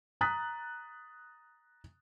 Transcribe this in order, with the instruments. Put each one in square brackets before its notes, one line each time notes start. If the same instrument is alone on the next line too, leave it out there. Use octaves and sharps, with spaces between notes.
[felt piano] A#5 D#6 F#6 A6 B6